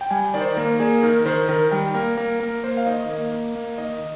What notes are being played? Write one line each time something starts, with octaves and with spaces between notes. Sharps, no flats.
G5
G3 G#5
D#3 D5
C5
D5
A#3 A#4
A#3 G#4
D#3 A#4
D#3 C5
D#3 A#4
G3 G5
A#3 A#4
A#3 A#4
A#3 A#4
A#3 C5
F5
D#3 D#5
A#3
A#3
A#3
D#3 D#5